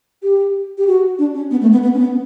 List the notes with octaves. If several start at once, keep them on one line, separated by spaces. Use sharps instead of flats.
G4
G4
F#4
D4
C#4
B3
A3
B3
B3
C#4
B3